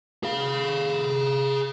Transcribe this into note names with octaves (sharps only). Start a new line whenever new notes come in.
G#4 F5